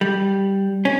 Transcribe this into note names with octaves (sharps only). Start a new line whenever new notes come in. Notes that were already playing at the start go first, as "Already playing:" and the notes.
G3
C#4